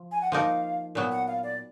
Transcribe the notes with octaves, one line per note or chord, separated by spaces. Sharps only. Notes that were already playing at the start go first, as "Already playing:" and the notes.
Already playing: F3
G#5
F#5
F3 A#3 D#4 A#4 F5
A#2 F#3 B3
F#5
F5
D5